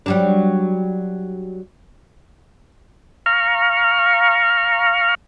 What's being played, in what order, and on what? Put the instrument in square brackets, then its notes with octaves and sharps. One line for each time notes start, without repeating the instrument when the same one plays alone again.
[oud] F#3 G3 D4
[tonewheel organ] F5 A#5 C#6 F6